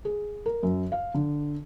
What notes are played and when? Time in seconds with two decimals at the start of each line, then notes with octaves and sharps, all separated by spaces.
0.05 G#4
0.46 A#4
0.63 F#2
0.92 F5
1.14 D3